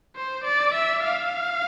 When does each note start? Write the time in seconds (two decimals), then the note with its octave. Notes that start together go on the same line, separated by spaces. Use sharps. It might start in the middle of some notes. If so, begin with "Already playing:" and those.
0.16 C5
0.44 D5
0.74 E5
1.04 F5